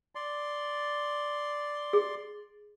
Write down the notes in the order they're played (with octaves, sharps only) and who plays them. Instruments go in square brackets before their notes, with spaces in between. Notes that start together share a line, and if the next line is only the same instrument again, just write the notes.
[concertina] D5 C6
[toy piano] G#4